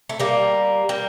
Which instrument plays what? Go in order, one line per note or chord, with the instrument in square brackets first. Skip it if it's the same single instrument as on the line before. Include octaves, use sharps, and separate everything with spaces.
[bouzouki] A3
G3 A#3
G3 A#3